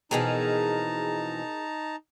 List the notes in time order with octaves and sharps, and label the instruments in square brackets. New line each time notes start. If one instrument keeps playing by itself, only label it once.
[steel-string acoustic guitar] F2 B2 E3 [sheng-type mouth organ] D#4 A5 A#5 [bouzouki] G#4 A#4